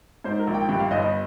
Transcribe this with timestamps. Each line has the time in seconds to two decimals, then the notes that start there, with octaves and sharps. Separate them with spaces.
0.24 G#2 C5
0.40 A#4
0.47 A#1
0.54 G5
0.69 G2 G5
0.80 F5
0.91 G1 D#5
1.01 D#5